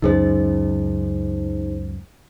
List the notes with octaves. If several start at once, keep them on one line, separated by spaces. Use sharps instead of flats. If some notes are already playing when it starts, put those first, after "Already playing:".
C#2 F#2 D#4 G#4 C5